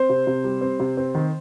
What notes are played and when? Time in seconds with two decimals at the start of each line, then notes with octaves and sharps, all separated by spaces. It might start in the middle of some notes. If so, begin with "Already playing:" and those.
Already playing: C4 C5
0.10 C3
0.27 C3
0.44 G3
0.61 C4
0.80 C3
0.97 C4
1.15 D#3